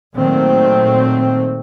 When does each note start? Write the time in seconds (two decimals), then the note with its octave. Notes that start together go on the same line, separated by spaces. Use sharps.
0.15 A#2 D#3 F#3 A3 C4